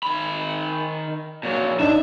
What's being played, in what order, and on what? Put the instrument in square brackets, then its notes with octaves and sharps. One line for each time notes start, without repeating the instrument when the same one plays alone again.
[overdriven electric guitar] D#3 B5
A#2 F#3
[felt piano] D4 D#4 [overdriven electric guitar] E5